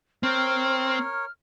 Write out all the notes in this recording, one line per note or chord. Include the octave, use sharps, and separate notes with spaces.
C4 A#4 C#5 F6